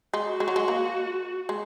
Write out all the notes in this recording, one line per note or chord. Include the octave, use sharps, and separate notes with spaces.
G#3
F#4
G#3
F#3
G#3
A#3
G#3